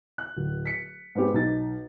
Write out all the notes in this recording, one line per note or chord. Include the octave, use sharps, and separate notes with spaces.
F#6
D1
B6 C#7
G#2 B3 C4 G4 G#4
B1 D#4 A6